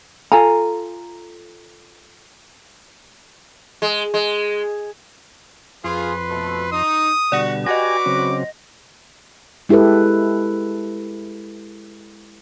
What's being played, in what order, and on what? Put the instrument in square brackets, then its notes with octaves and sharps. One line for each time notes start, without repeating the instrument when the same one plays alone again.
[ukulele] F4 A4 G#5 A#5
[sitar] G#3
G#3
[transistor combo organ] F2 C6 [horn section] F4 G#4 [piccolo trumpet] B4
[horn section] B2 A3
[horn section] D#4 [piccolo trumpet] D#6
[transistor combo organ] B2 D3 G3 [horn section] F#4 [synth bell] D5 F#5
[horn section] F#4 B4 [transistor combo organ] G4 G#5 [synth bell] D#5 A#6 [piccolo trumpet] D6
[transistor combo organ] C#3 F#3 C4
[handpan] G#3 E4 G4 A4 B4